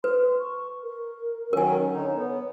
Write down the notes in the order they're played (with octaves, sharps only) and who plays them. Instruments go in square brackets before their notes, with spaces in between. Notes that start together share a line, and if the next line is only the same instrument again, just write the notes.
[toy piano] B4 [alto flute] C6
[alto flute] C#6
A#4
[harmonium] D#3 F#3 C#4 [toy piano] A#4 G#5 [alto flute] C#5
[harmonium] D3 D#4
B3